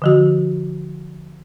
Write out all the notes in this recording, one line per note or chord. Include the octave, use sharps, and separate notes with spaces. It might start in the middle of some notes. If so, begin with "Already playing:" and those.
D3 F3 F#4